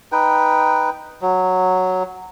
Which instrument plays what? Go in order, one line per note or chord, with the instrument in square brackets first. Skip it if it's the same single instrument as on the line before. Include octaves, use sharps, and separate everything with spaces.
[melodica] D#4 B4 G5
F#3